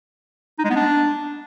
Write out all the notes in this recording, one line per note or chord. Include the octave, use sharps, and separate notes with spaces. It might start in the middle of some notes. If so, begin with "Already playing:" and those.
D#4
G#3
B3
D4